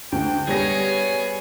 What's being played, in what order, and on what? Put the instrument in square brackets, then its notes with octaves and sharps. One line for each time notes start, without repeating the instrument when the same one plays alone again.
[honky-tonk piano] D2 [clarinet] G5
[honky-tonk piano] G3 A#6 [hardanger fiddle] B3 G#4 [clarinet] C#5